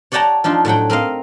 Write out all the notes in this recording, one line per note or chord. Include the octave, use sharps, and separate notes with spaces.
C#5 D5 F#5 G5 A5 A#5
F3 D4 D#4 F4
A2 F#3 F#5 G5
C4 A#4 D#5 F5